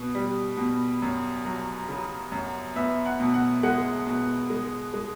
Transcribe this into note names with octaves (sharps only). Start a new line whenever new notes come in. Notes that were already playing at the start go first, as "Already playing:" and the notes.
Already playing: B2 B3
G3
B2
F#2
F#3
C#3
F#2
B3 E5
F#5
B2
F#5
G#3 F#5
B2
G#3
G#3